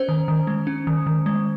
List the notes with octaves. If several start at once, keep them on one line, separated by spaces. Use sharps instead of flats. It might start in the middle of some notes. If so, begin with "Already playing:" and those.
Already playing: C#4 C5
D#3
D#3
G#3
C#4
D#3
D#3
G#3